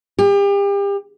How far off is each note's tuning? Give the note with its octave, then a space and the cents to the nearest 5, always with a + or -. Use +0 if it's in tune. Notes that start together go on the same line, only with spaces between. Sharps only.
G4 +35